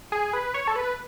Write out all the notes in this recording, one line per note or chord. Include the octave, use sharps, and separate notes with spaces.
G#4
B4
C#5
A4
B4